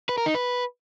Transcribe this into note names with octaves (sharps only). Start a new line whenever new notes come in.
B4
A#4
D#4
B4